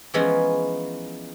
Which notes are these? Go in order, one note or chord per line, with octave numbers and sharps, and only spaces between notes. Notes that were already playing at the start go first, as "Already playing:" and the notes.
E3 F3 G#3 B3 C#4 D#4